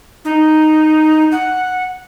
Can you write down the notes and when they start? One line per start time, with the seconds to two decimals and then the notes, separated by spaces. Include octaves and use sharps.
0.25 D#4
1.32 F#5